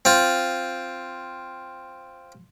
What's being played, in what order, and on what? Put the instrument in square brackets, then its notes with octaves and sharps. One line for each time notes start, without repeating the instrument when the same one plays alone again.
[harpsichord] C4 F4